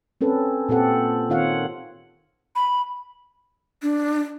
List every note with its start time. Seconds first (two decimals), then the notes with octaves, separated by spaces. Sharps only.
0.21 C4 C#4 A4 B4
0.69 A#2 C4 G4 A4 F#5
1.30 D#3 C4 F4 C#5 F5 F#5
2.56 B5
3.82 D4